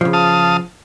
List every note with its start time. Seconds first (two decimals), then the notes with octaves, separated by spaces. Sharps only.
0.01 C#3 F3
0.13 F5 A5 D#6